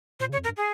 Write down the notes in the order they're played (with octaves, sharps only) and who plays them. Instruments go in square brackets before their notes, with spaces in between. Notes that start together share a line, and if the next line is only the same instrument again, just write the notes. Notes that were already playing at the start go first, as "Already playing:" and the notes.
[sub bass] A#2 [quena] C5
[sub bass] C#3 [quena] C#5
[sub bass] F2
[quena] A#4
[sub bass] G2
[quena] G#4